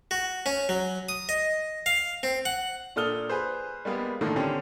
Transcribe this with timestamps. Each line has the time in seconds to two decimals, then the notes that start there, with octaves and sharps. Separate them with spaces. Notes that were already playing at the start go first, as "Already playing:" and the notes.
0.11 F#4
0.46 C#4
0.69 F#3
1.09 D#6
1.29 D#5
1.86 F5
2.23 C4
2.45 F#5
2.96 A#2 D4 A4 D#6 F6 G7
3.29 G#4 B4 C5
3.85 G3 G#3 A#3 B3
4.21 A2 D3 D#3 F3 A#3 A4
4.36 D3 C4 C#4 G4